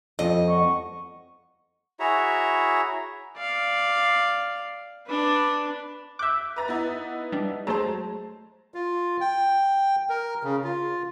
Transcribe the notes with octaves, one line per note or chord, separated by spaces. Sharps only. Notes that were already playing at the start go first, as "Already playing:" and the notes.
F2 D#5
F#5 C#6
E4 F#4 G#4 C#5 E5 A#5
D5 F5
D4 B4
E5 D6 F#6 G6
B4 A#5 A6
B3 D#4 E4
G3 D4
F#3 G#3 A3 C5 A5 A#5
F4
G5
A#4
C#3
F4